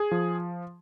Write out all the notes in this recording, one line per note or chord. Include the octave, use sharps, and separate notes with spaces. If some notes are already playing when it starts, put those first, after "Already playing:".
Already playing: G#4
F3